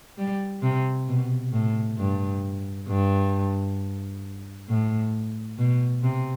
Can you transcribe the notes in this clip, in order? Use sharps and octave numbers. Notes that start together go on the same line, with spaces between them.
G3
C3
B2
A2
G2
G2
A2
B2
C3